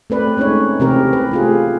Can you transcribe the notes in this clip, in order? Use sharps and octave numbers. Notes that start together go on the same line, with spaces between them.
A3 C4 B4 D5
G#3 A3 C#4 D#4 C#5
C3 E3 C4 G4 A#4
B4
A3 F4 G#4